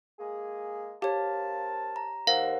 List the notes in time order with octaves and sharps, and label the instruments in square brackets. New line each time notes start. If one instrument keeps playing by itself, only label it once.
[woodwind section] G#3 A#3 G#4
[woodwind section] C4 A#4 A5 [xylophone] G4 C#5 [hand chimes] F5
[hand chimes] A#5
[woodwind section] D#2 [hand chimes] A#4 C5 F#5 [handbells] F5